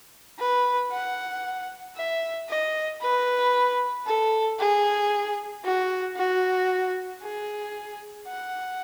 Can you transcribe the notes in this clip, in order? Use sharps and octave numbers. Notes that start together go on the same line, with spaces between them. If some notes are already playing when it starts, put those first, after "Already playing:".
B4
F#5
E5
D#5
B4
A4
G#4
F#4
F#4
G#4
F#5